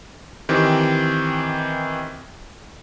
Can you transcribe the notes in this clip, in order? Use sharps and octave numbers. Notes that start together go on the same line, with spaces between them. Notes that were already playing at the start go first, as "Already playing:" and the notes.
D#3 E3 C4 G4